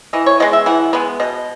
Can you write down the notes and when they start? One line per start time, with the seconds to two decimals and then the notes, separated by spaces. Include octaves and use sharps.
0.13 E3 D#5
0.26 C#5
0.40 G#3 B3 D#5
0.53 E5
0.66 E3 F#5
0.93 G#3 B3
1.20 B2 D#5